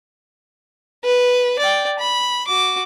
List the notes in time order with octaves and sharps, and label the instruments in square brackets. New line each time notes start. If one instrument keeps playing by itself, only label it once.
[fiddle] B4
D5 G5
B5
F#4 D6